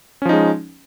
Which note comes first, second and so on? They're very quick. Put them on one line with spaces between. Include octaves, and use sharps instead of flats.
C#4 F3 D#4 G#3